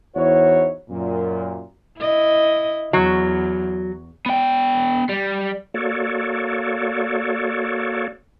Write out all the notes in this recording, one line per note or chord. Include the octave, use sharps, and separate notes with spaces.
E2 D#4 E4 F#4 C5 C#5
F#2 A#2
E4 D#5
E2 F#3
B3 G5
G3
A#3 F#4 A4 C#5 D5